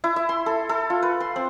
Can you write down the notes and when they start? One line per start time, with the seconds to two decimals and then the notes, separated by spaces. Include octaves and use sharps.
0.04 E4
0.16 E5
0.29 C6
0.46 A4
0.69 A4
0.90 F4
1.02 B4
1.20 C6
1.36 C4